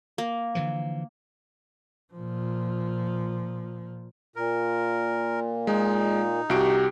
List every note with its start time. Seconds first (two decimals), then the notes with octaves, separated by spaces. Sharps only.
0.18 A#3
0.55 D3 E3 F3
2.13 A#2 F3
4.36 A#2 A#4
5.67 G#3 D#4
6.50 C2 F#4 G4 D7